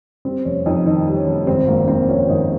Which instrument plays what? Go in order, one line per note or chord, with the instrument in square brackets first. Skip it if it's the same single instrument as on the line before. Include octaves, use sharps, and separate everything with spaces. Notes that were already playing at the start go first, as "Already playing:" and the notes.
[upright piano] G3 C4
F1 C#4
F2 D#4
D#3 D#4
G3
C#4
F1
G#1 C4
G#1 A#3
G#2 C4
F3 C#4
G#1 D#4